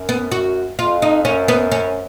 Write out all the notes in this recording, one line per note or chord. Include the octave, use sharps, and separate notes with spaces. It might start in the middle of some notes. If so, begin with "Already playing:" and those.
Already playing: F#2
B3
F#4
F2 F4
D#4
F#2 C#4
B3
C#4